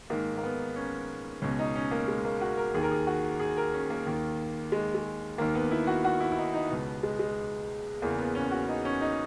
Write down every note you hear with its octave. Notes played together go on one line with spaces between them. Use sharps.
G#2 D#3 A#3
A#3
B3
C#4
C#2 B2 C#4
D#4
C#4
A#3
G#3
A#3
F#4
A#4
D#2 D#3 G#4
A#4
G#4
F#4
G#4
A#4
C#4
A#3
D#2 D#3
G#3
G#3
D#2 D#3 A#3
B3
E4
F#4
F#4
E4
E4
D#4
D#4
C#2 B2 B3
G#3
G#3
E2 C#3 E3 A#3
B3
C#4
F#4
D#4
C#4
D#4